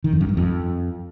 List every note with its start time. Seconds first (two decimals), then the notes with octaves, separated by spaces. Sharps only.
0.04 D#3
0.12 F2
0.21 F#2
0.29 G2
0.37 F2